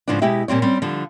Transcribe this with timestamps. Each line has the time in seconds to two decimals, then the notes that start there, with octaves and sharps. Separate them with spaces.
0.08 G#2 C#3 F3 B3 D4
0.22 B2 G#3 E4 G4 E5
0.48 A#2 G3 C4 C#5
0.62 G3 C4 C#4
0.82 D3 F3 G3